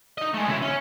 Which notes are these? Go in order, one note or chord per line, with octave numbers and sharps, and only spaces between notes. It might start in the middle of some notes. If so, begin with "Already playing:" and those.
D#4 D#5
G#3 A3
C#3 E4
C#4